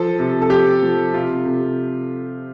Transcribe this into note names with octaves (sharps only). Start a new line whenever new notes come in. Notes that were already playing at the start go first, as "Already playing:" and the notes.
Already playing: F3 A4
C3
A4
F3 G4
F3
C3 F4
C3